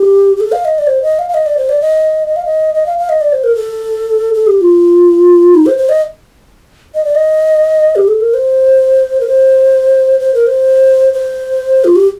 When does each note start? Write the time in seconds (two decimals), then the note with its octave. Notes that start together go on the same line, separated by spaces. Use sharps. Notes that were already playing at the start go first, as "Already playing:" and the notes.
Already playing: G4
0.37 G4
0.40 A4
0.52 F5
0.65 D#5
0.78 D5
0.87 C5
1.03 D#5
1.19 F5
1.29 F5
1.34 D#5
1.46 D5
1.58 C5
1.69 D5
1.81 D#5
2.27 D#5
2.36 F5
2.45 D#5
2.74 D#5
2.86 F5
2.98 F5
3.09 D#5
3.21 D5
3.33 C5
3.44 A#4
3.55 A4
4.34 A4
4.47 G4
4.61 F4
5.54 D#4
5.66 C5
5.78 C5
5.89 D#5
6.94 D#5
7.05 D5
7.15 D#5
7.96 G4
8.08 A4
8.21 A#4
8.34 C5
9.21 A#4
9.27 C5
10.20 C5
10.34 A#4
10.47 C5
11.13 C5
11.84 F4
11.96 G4